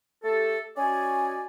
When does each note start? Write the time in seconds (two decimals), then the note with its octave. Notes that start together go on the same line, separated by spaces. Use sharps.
0.24 A3 G4 A4
0.77 C#4 F#4 D5 D#5 G#5